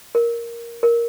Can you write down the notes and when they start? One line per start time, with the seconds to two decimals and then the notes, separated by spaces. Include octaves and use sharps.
0.15 A#4
0.83 A#4